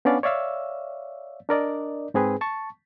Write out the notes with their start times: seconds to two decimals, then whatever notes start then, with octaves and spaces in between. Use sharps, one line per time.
0.05 B3 C#4 D4 D5 F5
0.23 C#5 D5 E5 F5 E6
1.49 D4 A#4 D5 D#5
2.14 G#2 C4 G#4 B4
2.41 A5 C#6